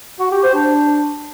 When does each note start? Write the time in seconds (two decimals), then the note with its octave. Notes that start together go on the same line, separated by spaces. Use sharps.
0.20 F#4
0.32 G4
0.43 C5
0.55 D4